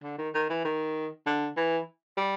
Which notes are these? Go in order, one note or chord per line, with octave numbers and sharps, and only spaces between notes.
D3
D#3
D#3
E3
D#3
D3
E3
G3